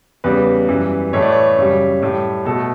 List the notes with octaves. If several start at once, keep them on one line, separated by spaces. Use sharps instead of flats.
E2 C#3 G3 B4
F#2 E3 G3
A2 E3 A3 C#5
D5
C#5
F#2 C#3 G3
A2 G3
B2 A3 A4